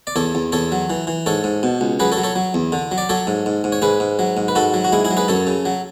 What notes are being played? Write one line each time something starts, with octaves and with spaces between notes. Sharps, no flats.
D5
E2 A4 C#5
E2
E2 A4 C#5
F#3
E3
E3
G#2 A4 C#5
G#2
B2
C#2
F#3 G#4 B4
A4 C#5
F#3
A4 C#5
F#3
E2
D3
F#3
D5
F#3 A4 C#5
G#2
G#2
G#2
C#5
G#2 G#4 B4
G#2
F#3
G#2
B4
G#2 F#4 A4
F#3
F#4
G#2 E4 G#4
E4 G#4
F#3
G#4 B4
F#2 A4 C#5
C#3
F#3